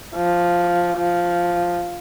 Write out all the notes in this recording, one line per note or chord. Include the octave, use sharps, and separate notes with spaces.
F3
F3